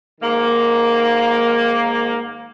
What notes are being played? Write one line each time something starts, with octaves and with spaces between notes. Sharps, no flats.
G#2 D#3 A#3